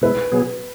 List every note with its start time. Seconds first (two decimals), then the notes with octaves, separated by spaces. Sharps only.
0.02 B2 G#3 E4 B4
0.32 B2 F#3 B3 G#4